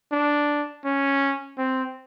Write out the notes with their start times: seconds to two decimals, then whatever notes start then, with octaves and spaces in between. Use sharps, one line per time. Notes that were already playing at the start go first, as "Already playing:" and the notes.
0.12 D4
0.85 C#4
1.58 C4